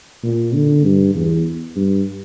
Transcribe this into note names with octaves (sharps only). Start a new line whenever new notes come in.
A#2
D3
G2
E2
G2